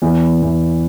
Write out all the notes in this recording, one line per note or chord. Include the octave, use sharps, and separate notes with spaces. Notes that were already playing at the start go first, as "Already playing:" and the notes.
E2
E2